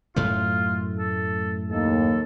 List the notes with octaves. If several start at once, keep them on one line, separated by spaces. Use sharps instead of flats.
F#2 A2 A3 F4
A4
D#2 A4